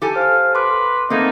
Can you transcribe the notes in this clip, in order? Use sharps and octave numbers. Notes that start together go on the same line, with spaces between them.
G4 A4 G#5
C5 F5
B4 C6 D6
A3 A#3 C4 D#4